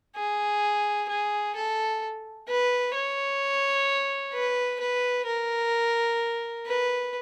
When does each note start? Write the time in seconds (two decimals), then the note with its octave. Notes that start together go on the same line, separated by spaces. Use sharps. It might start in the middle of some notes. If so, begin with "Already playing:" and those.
0.16 G#4
1.09 G#4
1.55 A4
2.48 B4
2.95 C#5
4.34 B4
4.80 B4
5.27 A#4
6.67 B4